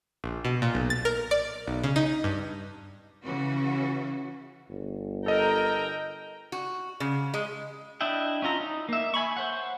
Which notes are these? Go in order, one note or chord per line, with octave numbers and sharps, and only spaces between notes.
A#1
B2
A#2
B1
A6
A#4
D5
B1
C#3
D#4
G2
C#3 E3 C#4 F#4
G1
A4 A#4 D#5 G5 A#5
F#4
C#3
G#3
D4 E4 D#5 E5 G5
C#4 E4 F4 A#5
D#4
A#3 E5
E5 G#5 B5 C#6
C5 C#5 F#5